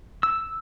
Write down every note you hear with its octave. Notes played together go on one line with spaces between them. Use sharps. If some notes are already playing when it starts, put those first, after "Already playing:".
E6